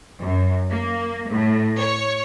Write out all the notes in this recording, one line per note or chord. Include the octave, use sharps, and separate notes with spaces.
F#2
A#3
A2
C#5